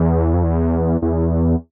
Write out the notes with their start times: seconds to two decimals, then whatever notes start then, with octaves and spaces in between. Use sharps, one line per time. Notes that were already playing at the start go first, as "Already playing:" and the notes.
Already playing: E2
0.34 F2
0.43 E2
1.02 E2